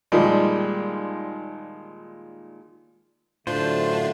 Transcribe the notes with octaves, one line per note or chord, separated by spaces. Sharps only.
A#2 D#3 F3 G3 G#3
F#2 A2 D3 A3 D4 F4 C5